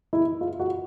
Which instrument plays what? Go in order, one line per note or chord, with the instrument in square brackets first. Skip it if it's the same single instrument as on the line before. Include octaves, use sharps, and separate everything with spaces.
[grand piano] E4
F4
F#4